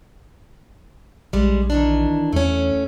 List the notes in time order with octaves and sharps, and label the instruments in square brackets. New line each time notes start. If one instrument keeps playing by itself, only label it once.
[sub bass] A#1 [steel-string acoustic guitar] G3 G#3
[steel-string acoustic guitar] D#3 E3 D4
[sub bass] E2 [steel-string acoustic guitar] A3 C#4